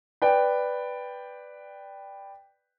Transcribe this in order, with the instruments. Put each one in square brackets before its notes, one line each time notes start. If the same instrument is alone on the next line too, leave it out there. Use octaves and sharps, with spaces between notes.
[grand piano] B4 D5 G5